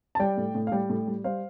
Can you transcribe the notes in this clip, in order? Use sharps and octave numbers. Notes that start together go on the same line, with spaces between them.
A5
G3 D5 G5
A2
A2
F5
G3 D5 G5
A2
G3
G3 C5 F5